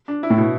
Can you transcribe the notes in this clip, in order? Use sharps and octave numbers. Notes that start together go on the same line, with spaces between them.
D4
E4
A2
B2